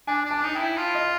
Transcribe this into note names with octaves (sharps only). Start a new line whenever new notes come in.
D4 G#5
D4
A5
D#4
E4 G5
F4
D#5